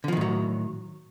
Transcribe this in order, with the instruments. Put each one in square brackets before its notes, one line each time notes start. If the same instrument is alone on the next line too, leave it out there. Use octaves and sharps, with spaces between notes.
[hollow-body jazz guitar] D3
F3
D#3
A2
F#3